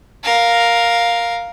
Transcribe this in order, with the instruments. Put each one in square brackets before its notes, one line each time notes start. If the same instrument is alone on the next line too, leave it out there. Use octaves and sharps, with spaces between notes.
[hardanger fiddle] A#4 F5